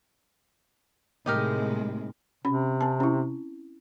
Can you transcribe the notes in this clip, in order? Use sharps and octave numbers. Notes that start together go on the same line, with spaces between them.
A2 C3 G#3 D#4 G4 A#4
C3 C#4 B5
C4 A5
C#4 E4